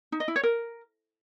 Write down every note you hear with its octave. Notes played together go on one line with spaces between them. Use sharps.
D#4
D#5
E4
C#5
A#4